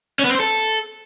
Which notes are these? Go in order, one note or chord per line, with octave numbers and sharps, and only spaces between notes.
C#4
B3
C4
C5
A4